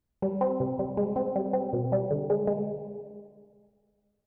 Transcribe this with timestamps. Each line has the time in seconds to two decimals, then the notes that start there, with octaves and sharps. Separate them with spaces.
0.22 G3
0.41 C4
0.60 C3
0.79 G3
0.97 G#3
1.16 C4
1.36 G3
1.53 C4
1.73 B2
1.92 G3
2.11 D3
2.30 G#3
2.47 G#3